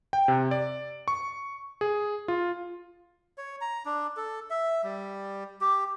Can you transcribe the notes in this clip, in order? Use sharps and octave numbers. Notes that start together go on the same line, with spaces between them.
G5
C3
D5
C#6
G#4
F4
C#5
A#5
D4
A4
E5
G3
G4